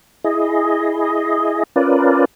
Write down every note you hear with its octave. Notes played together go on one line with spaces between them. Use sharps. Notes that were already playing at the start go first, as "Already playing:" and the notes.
E4 G#4 D#5
C#4 F4 A#4 B4 D5